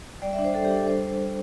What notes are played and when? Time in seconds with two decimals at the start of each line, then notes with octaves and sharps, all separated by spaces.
0.22 G3 D5
0.33 E5
0.38 D4
0.44 C5
0.55 G3 A4
0.65 G4
0.71 D4
0.77 A4
0.87 G3 C5